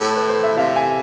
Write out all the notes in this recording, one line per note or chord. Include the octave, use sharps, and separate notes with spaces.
A2 A4
B4
C5
E5
C3 F5
G#5